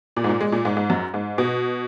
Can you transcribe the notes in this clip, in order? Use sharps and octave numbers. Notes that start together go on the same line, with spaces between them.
A#2
G#2
A#2
G#3
A#2
G#2
G#2
F#2
G#2
B2